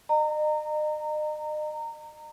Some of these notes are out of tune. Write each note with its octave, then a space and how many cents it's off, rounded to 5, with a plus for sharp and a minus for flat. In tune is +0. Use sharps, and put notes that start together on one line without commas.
D#5 -40 A#5 -25